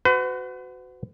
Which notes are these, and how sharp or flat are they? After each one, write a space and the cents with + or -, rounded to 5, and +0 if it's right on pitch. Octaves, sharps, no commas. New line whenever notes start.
F#4 +0 B4 +40